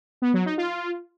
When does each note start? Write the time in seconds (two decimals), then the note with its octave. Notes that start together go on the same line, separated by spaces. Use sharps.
0.22 B3
0.34 F#3
0.46 D#4
0.58 F4